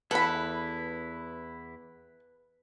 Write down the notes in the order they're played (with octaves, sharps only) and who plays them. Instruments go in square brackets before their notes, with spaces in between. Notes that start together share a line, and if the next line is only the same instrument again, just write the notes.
[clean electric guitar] E2 E4 [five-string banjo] A4 B5 [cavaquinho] B4